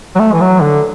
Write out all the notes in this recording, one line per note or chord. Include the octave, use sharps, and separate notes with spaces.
F#3
A3
E3
F#3
D3